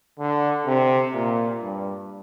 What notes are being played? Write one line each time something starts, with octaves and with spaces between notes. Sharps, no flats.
D3
C3
A#2
G2